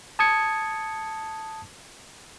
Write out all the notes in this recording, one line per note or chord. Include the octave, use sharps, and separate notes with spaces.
A5 D#6 G#6 C#7